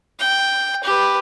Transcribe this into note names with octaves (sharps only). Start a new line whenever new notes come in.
G5
G4 B4